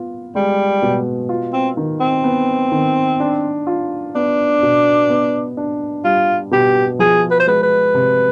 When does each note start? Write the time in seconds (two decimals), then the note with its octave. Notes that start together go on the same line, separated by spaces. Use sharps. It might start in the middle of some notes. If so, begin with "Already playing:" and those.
Already playing: B3 F4
0.35 G3 G#3
0.82 B2
1.29 F4
1.53 C4
1.77 D#3
2.00 C4
2.24 B3
2.72 D#3
3.20 D4
3.67 F4
4.15 B3 D4
4.63 B2
5.10 B3
5.57 D4
6.05 G3 F4
6.51 B2 G4
6.99 F3 G#4
7.31 B4
7.40 C5
7.47 G#3 B4
7.63 B4
7.94 C3